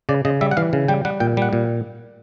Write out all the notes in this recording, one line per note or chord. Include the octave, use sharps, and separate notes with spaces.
C#3 D5
C#3 D#5
G3 E5
F#5
E3 F5
C#3
G3 G5
G3 F#5
A#2 G5
G3 F#5
A#2